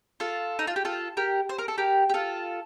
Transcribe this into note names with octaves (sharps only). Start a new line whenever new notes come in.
F4 A4
D#4
F4
G4
F4 A4
G4 A#4
C5
A#4
A4
G4 A#4
G4
F4 A4